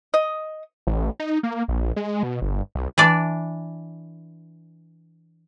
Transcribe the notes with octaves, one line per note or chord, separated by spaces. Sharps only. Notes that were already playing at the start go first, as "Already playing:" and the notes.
D#5
A1
D#4
A#3
A#1
G#3
B2
G1
C2
E3 D4 D5